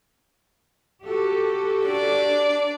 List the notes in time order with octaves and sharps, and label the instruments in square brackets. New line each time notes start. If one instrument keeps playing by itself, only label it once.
[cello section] F#4 G4 A4
[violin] D4 D5